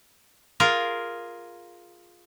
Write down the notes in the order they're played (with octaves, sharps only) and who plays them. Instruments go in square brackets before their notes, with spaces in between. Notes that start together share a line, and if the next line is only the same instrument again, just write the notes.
[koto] F4 G#4 A#4